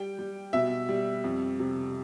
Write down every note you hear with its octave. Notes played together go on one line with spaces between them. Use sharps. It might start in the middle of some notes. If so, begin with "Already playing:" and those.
Already playing: G3 G5
G3
B2 E5
G3
F2
C3